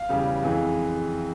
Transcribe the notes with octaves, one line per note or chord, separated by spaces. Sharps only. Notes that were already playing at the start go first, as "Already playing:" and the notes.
Already playing: F5
E2 C#3 G3
F2 E3 G#3